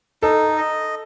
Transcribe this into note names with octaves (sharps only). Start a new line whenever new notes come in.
D#4 A4
D#5